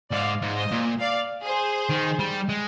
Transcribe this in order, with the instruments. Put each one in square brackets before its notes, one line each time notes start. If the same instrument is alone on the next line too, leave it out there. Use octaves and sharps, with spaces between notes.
[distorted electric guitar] G#2 [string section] D5 F5
[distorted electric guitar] G#2
[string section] C5 D#5
[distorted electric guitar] A#2
[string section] D5 F5
G#4 C5
[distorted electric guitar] D#3
G3
G#3